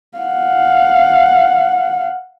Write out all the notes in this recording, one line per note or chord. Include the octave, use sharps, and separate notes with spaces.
F5 F#5